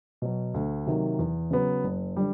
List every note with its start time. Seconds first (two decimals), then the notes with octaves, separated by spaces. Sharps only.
0.22 B2 F#3
0.54 D2
0.86 C3 D#3 F#3 A#3
1.19 E2
1.51 C#3 F#3 B3
1.84 F#1
2.16 D3 G3